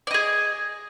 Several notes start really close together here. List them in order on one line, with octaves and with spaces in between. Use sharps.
D5 D#5 G#4